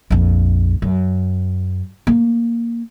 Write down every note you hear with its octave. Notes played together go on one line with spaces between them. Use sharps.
A#1 F2
F#2
A#3